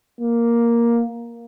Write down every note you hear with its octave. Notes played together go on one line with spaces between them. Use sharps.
A#3